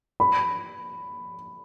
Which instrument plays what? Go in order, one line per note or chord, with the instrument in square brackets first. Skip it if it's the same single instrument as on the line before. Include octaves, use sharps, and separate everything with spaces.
[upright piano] B5